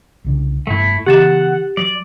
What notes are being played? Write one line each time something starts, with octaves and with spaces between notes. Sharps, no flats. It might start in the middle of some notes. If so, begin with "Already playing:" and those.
C2 C#3 D4
F1 G2 A3 B3 E4
C#3 E3 B3 G4 F#5 A6 E7
F#3 D5